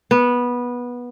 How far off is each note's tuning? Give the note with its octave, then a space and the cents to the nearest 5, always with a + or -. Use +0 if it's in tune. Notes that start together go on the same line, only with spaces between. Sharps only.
B3 -15